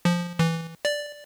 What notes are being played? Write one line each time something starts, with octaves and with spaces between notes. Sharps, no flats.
F3
E3
D5